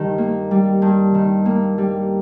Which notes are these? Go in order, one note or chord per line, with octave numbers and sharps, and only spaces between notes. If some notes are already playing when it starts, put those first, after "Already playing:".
Already playing: G2 D#3
A#3
G3
G2
D#3
A#3
G3